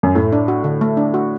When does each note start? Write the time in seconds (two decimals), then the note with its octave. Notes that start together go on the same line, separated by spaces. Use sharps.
0.03 F#2
0.15 A2 A3
0.32 D4
0.48 F#4
0.64 D3
0.81 A3
0.97 D4
1.14 F#4